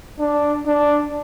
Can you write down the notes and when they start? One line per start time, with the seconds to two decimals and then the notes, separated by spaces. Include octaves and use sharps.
0.19 D4
0.66 D4